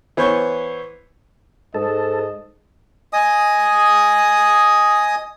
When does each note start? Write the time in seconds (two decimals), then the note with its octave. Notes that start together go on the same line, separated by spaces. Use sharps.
0.17 E3 B3 C5 C#5 C#6
1.74 G#2 A4 D#5
3.13 D#5 G#5 D#6